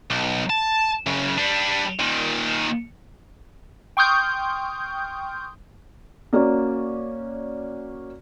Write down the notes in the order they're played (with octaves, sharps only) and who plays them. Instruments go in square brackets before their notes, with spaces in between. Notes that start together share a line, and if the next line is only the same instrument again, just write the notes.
[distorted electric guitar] B1
A5
F#2 C#3
G3 D4
A#2 D#3
[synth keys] G5 C6 C#6 D#6 F6 G6
[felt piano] A#3 C#4 F#4 D5